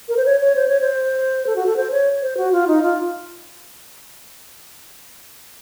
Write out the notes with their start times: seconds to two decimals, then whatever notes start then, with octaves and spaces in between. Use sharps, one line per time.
0.09 A#4
0.17 C5
0.26 C#5
0.41 C#5
0.56 C5
0.68 C#5
0.81 C5
1.47 A4
1.56 F#4
1.66 A4
1.77 C5
1.92 C#5
2.22 C5
2.37 F#4
2.52 F4
2.67 D#4
2.82 F4